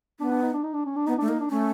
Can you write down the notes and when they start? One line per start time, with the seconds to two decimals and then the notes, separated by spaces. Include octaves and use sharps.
0.20 B3 D4
0.31 D4
0.42 D#4
0.53 D4
0.63 D#4
0.74 D4
0.85 C#4
0.96 D4
1.06 B3 D#4
1.18 D4
1.21 A3
1.28 A#3 D#4
1.40 D4
1.50 A3 C#4